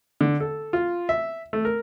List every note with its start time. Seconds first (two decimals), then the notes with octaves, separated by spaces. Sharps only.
0.21 D3
0.40 A4
0.73 F4
1.09 E5
1.53 A3
1.65 A#4